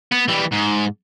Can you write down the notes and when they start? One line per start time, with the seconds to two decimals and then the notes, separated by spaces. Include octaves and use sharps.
0.12 B3
0.28 E3 G3
0.52 G#2